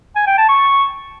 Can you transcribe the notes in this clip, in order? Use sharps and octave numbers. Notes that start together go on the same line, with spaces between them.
G#5
G5
A5
C#6